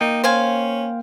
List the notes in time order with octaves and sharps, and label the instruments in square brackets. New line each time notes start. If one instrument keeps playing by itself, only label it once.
[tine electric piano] A#3 G5 [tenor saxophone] D#4
[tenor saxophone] C#4 [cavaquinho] C5 F5 G#5